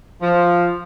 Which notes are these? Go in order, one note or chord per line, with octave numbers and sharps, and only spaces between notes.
F3